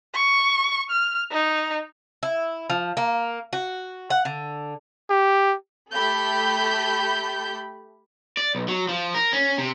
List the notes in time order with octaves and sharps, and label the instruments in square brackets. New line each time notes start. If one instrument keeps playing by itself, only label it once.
[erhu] C#6
F6
D#4
[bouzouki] E4
F3
A#3
F#4
F#5
D3
[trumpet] G4
[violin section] A3 G4 A4 B5 G6
[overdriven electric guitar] D5
B1
F#3
F3
A#4
C#4
C3